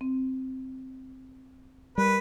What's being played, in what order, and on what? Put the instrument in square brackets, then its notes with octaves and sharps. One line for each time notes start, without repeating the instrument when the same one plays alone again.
[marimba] C4
[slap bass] G3 [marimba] A#4 [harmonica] B4